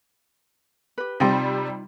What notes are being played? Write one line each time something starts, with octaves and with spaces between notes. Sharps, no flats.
G4 B4
C3 G3 D#4 F4 G5